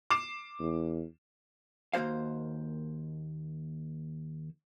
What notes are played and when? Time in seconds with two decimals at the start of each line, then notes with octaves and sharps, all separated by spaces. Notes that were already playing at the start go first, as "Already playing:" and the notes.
0.10 D6 C7 E7
0.60 E2
1.93 D#2 A#3 F#4 C5 F5